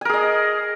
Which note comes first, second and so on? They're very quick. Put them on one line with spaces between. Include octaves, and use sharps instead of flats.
G#5 A#4 G#4 D#5